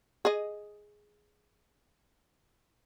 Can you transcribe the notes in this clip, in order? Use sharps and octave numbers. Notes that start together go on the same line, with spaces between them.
G#4 D#5